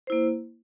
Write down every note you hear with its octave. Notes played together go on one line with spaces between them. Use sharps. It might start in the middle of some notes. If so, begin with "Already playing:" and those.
A#3 E4 C5